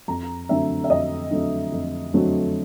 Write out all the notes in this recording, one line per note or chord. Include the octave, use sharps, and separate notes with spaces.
F2 A#5
D3 F#3 A3 C4 E5
E5
F2 D#5
D3 F#3 A3 C4
F2
D3 F#3 A3 C4